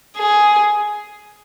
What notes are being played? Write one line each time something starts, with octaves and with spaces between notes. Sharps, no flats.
G#4